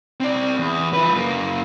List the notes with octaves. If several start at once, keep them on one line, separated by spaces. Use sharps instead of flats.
C4 D5
E2
F3 B4
F#2 A#3